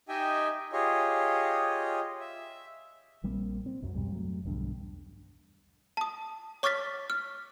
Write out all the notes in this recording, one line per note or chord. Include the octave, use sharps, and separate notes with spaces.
D#4 G4 D#5 E5 G5 G#5
F4 G4 G#4 C#5 D#5
E5
A#1 G3 A#3 C4
C4
C2 F#2 F#3
F2 G#2 B2 G3
F#3 A3
B1 E2 G2 D3
A5 D#6
C#5 C#6 D6 F6 A6 B6
F6